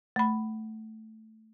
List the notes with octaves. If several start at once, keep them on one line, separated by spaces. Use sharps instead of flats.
A3 B5